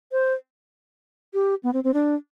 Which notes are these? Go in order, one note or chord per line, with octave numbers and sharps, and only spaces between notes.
C5
G4
B3
C4
C4
D4